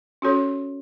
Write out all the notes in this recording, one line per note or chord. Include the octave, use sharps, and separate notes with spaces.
C#4 F#4 A4 C#5